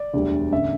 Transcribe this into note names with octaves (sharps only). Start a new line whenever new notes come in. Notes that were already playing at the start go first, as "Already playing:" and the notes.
Already playing: D5
E1 D2 D3 G3
A1 D3 E5